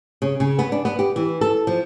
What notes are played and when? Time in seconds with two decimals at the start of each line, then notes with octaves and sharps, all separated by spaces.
0.22 C#3
0.40 C#3
0.59 B3
0.72 D4
0.85 B3
0.99 G4
1.16 E3
1.41 A4
1.67 F3